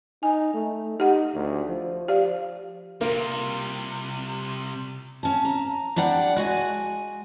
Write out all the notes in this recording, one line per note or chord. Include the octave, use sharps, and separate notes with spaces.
D#4 G#5
A3
D#4 G4 F#5
D2
F3
G4 D5 F5
C3 G3 A#3 F4
C#4 A5
A#5
G3 D4 D5 F#5 G5
G#3 F#4 G#5